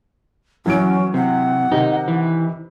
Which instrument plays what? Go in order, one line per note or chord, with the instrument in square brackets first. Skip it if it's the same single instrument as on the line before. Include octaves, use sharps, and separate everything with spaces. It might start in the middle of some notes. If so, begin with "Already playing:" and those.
[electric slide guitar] F#2 [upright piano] E3 F#3 D7 [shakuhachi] C#4
[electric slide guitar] C3 [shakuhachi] F#5
[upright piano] C3 D#3 [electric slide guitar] D#4
[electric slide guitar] E3